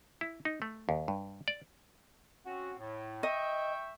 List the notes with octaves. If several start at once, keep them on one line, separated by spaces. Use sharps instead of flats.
E4
D#4
A3
D#2
G2
D5
C4 C#4 F#4
A2
D#5 E5 G5 C#6